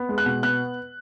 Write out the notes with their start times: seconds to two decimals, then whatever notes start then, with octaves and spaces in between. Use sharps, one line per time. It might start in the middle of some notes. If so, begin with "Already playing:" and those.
Already playing: B3
0.09 G#3
0.18 F#6
0.26 B2
0.43 B3 F#6